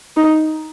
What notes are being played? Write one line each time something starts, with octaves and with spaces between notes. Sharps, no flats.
D#4